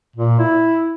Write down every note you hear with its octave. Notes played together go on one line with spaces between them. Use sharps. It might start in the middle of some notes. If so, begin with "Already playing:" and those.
A#2
E4